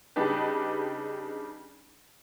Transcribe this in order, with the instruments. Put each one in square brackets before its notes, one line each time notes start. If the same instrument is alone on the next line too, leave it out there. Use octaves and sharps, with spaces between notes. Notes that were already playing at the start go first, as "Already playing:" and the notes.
[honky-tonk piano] C#3 G3 D4 D#4 G4 B4